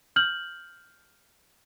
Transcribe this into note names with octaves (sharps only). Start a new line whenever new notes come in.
F6 G6 F#7